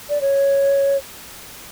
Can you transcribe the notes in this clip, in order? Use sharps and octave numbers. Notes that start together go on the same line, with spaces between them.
D5
C#5